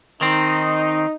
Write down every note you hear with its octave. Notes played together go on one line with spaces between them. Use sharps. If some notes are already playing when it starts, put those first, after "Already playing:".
D#3 C4 D#4